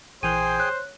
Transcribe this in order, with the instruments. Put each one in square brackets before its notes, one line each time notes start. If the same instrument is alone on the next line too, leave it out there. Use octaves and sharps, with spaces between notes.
[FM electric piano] A#1 E3 F#6 [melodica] G#4 G5 G#5 [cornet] C5 [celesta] D#7
[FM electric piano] C#5 [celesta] F#6